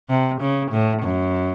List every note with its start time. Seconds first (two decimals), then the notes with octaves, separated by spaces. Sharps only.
0.09 C3
0.40 C#3
0.71 A2
1.02 F#2